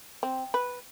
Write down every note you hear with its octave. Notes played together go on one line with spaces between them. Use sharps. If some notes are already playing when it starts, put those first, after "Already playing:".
C4
B4